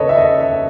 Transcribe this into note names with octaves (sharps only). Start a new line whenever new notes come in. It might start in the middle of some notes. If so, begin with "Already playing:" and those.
Already playing: D#2 C#3 A4 B4 C#5 D#5
E5
D#5
E5